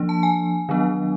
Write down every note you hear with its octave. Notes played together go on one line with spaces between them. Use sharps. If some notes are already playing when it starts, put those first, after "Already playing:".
Already playing: F3 A#3 D4
A5
G#5
D#3 F#3 B3 D4